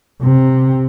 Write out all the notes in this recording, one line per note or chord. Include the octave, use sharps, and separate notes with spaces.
C3